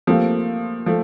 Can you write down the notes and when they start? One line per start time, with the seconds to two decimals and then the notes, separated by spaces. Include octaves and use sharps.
0.07 F3 A3 A#3 C4 G4
0.86 F3 A3